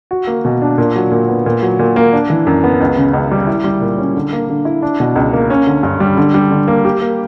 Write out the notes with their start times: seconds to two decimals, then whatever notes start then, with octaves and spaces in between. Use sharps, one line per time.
0.11 F#4
0.27 A#3
0.45 B2
0.62 D4
0.78 A#2
0.96 F#3
1.11 A#2
1.29 B3
1.46 A#2
1.62 F#3
1.79 A#2
1.96 A#3
2.13 D4
2.30 E3
2.46 F#2
2.64 B3
2.81 C#2
2.97 C#3
3.13 C#2
3.31 G3
3.47 E4
3.64 G3
3.81 A#2
3.98 C#4
4.15 D3
4.33 A#3
4.49 D3
4.65 E4
4.82 D4
5.00 B2
5.16 C#2
5.33 A#3
5.50 C#4
5.67 D3
5.83 G2
6.00 G3
6.17 D3
6.34 G3
6.51 D3
6.68 A#3
6.85 G4
7.02 A#3